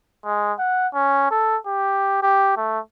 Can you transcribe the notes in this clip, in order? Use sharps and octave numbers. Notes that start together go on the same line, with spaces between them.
G#3
F#5
C#4
A4
G4
G4
A3